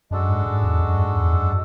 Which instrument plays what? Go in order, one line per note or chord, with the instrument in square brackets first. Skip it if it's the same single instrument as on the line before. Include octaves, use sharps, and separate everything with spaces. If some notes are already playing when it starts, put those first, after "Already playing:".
[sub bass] F#2 [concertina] G#3 D4 F#4 A4
[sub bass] G#2
G#2
E2
F#2
G#2
E2
F#2